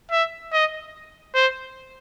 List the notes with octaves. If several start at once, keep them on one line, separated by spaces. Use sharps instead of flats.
E5
D#5
C5